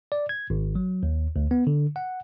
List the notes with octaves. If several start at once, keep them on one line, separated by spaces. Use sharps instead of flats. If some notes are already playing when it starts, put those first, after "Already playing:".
D5
G#6
G#1
F#3
D#2
D2
B3
D3
F#5